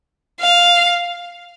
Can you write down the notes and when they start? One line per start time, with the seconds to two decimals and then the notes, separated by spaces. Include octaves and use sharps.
0.41 F5